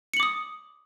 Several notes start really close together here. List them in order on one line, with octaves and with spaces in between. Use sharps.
C#7 F#7 D6 D#6